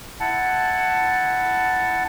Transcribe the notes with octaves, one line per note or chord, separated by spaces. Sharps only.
E4 F#5 A5